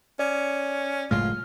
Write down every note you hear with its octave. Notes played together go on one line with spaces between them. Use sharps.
C#4 D5
F#1 A2 G#3 F4 F6